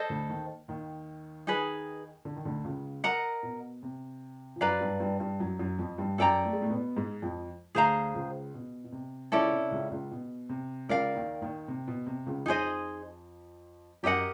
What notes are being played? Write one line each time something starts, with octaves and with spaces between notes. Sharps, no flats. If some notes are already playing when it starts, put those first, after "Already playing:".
Already playing: A4 C5 D#5
D2 D3
D#2 D#3
D#2 D#3
D#4 G#4 B4
D3
D#3
D2 D3
C#2 C#3
A#4 D#5 F#5 A#5
B2
C3
F3
F#2 F#3 B4 D5 F5 A#5
G2 G3
G2 G3
G2 G3
F#2 F#3
F#2 F#3
F2 F3
G2 G3
F#2 F#3 A4 D5 G5 A#5
A3
G#3
A2 A3
B2 B3
G#2 G#3
F2 F3
D2 D3 G#4 C5 F5 A#5
C#2 C#3
B2
B2
C3
C#2 C#3 C#4 E4 A4 D5
C3
C#2 C#3
C#2 C#3
B2
C3
C#2 C#3 A#4 D5 F5
D#2 D#3
D#2 D#3
C3
B2
C3
C#2 C#3
F2 F3 D#4 G#4 C5 D#5
F#2 F#3 G4 A#4 D#5 F#5